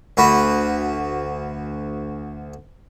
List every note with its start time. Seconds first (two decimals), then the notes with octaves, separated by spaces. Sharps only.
0.17 D2 F#4 B4